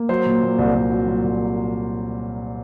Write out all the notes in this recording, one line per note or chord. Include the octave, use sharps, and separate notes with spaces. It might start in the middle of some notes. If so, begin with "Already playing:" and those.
Already playing: A#3
F#3 C5
A#2
A#2
C2
C2
F#3
A#2
C2